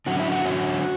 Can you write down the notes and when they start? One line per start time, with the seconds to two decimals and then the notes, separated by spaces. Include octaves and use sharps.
0.06 D3 F#3 C#4 F#4
0.19 E4
0.32 F#4
0.45 D3 F#3 C#4